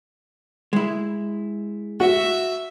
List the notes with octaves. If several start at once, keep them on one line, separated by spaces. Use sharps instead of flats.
G#3 E4
F#4 E5